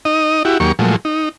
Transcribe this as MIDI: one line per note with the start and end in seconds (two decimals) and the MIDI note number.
0.05 0.43 63
0.05 0.43 75
0.45 0.58 64
0.45 0.58 66
0.45 0.58 67
0.60 0.72 39
0.60 0.72 54
0.60 0.72 58
0.60 0.72 67
0.60 0.72 85
0.79 0.96 46
0.79 0.96 53
0.79 0.96 54
0.79 0.96 56
0.79 0.96 57
1.05 1.29 63